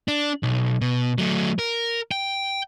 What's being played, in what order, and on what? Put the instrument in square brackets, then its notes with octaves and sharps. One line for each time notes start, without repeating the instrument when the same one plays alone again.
[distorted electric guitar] D4
B1
B2
F#3 A3
A#4
G5